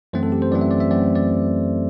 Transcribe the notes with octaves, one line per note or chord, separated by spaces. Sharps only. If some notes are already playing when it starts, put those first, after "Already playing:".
F#2 E3 A3 C4 C5
A4
G4
C5
F#2 E3 A3 C4 D5
E5
D5
E5
F#2 E3 A3 C4 D5
D5